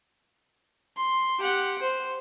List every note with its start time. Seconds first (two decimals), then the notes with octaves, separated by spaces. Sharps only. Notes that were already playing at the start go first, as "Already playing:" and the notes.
0.97 C6
1.39 G4 F#5
1.82 C5